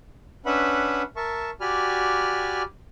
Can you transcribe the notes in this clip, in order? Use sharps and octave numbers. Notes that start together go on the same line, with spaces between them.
C#4 D4 B4 E5 F#5 B5
A#4 E5 A5 C#6
F#4 G4 D5 G#5 B5 F6